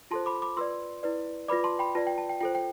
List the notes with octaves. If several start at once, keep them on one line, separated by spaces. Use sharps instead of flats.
F4 A4 C5 A5 C6
B5 D6
B5 D6
F4 B4 D5 C6 E6
E4 B4 D5
F4 B4 D5 B5 D6
A5 C6
G5 B5
F4 B4 D5 A5
G5
A5
G5
F4 A4 C5 G5
G5